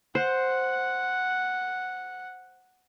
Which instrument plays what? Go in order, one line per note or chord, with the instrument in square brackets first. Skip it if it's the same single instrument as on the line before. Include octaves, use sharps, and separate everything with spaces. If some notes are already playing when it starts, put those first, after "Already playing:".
[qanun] C5 [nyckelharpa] F#5